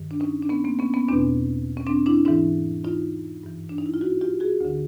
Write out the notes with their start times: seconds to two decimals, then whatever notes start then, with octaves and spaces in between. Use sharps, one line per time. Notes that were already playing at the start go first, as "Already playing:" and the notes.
Already playing: G2 D#3
0.11 D4
0.20 C#4 D#4
0.42 D4
0.50 B3 C#4
0.64 A#3 C4
0.79 B3 C#4
0.94 B3 C#4
1.08 E2 B2 C4 D4
1.77 C#4
1.87 C4 D4
2.06 D4 E4
2.25 G#2 E3 D4 E4
2.84 D#4 F4
3.43 G2 E3
3.69 D4
3.78 D#4
3.86 E4
3.94 F4
4.01 E4 F#4
4.21 F4 G4
4.40 F#4 G#4
4.61 D2 D3